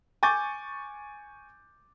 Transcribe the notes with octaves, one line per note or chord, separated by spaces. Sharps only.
G#5 C#6 D6 G6 A6